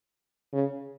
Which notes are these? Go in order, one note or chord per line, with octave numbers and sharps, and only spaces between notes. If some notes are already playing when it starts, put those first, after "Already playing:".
C#3